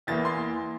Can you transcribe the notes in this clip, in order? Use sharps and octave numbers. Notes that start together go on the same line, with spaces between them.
E2 E3 A#3 A6
C6